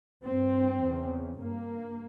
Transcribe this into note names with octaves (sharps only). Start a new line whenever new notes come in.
G2 C4
E2 C#3
G2 A#3